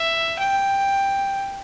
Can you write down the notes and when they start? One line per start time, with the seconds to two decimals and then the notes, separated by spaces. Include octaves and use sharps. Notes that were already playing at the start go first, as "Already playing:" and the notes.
Already playing: E5
0.39 G5